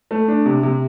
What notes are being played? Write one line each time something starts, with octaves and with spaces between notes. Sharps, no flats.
A3
D4
C3
C3